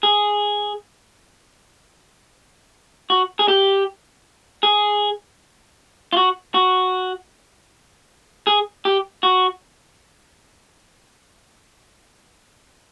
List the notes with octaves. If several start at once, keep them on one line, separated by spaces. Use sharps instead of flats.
G#4
F#4
G#4
G4
G#4
F4
F#4
F#4
G#4
G4
F#4